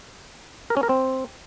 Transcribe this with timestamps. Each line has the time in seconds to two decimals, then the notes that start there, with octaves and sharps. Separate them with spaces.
0.70 A#4
0.77 C#4
0.83 A#4
0.89 C4